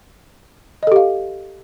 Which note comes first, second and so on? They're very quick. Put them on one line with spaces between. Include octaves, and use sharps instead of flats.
D#5 A4 G4 F5